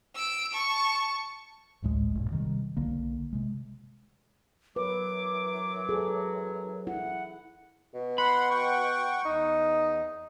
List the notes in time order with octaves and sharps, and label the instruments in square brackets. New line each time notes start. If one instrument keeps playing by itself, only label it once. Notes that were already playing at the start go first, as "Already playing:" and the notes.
[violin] E6 D7
A5 C#6
[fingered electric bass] A1 D2 A2 G#3
A#1 F#2 A#2
C3 D#3 G3
B1 D3 A#3
C3 G#3
[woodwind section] F#2 E3 F#3 [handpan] B4 [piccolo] D6
[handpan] G#4 A4
[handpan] E4 [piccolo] F#5
[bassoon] B2
[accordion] F#5 C6 [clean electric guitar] B5
[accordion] F#5 G5 C#6
[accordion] E2 [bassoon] D#4